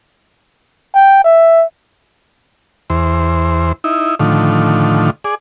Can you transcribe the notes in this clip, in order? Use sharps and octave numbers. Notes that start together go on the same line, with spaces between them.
G5
E5
E2 C5
D#4 E4
A2 D3 D#3 F3
G#4 D5